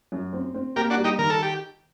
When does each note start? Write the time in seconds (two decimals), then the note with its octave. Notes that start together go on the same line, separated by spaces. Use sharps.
0.12 F#2
0.33 C4
0.54 C4
0.76 A#3 G4 A#4
0.90 D4 F#4
0.97 G3
1.04 D#4 G4
1.19 D#3 A#4
1.30 A4
1.42 G4